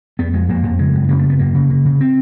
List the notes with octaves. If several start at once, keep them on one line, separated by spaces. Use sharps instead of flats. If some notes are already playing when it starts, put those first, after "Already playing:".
F2 B3
F2 G#3
F2 A#3
F2
C#3 G#3
F#2
C#3 A#3
A3
F#2
B3
F#2 A#3
C#3
C#3
C#3
C4